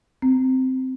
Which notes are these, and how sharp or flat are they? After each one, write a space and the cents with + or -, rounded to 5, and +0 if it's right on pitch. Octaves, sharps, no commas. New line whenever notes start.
C4 -10